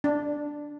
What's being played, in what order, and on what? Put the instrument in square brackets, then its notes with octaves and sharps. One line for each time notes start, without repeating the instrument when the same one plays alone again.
[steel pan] D4